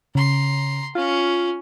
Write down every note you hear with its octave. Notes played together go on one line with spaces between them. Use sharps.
C#3 A#5 C6
C#4 F4